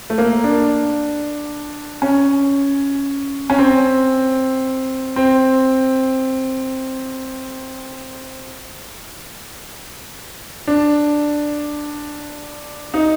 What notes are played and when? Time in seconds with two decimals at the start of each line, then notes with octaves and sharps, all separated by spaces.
0.10 A3
0.18 A#3
0.44 D4
2.02 C#4
3.50 C#4
3.58 C4
5.16 C4
10.67 D4
12.94 D#4